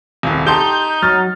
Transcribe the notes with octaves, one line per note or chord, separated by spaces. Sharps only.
D#1 C2
D#4 G4 A5 C6 G6
F#3 F6 A6